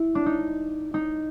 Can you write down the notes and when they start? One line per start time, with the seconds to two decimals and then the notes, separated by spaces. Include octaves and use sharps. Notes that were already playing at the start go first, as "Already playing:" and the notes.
Already playing: E4
0.15 D4
0.26 D#4
0.94 D#4